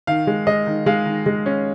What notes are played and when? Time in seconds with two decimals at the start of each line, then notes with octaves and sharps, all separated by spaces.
0.07 D#3 F5
0.27 G#3
0.47 G#3 D#5
0.67 D#3
0.86 G#3 F5
1.06 D#3
1.26 G#3
1.46 C#4